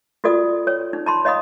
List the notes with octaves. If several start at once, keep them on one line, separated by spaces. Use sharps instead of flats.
F4 F#4 A4 D5 D#6
C#5
D#4
A5 B5 C6
C#5 D#5 F5 B5 D#6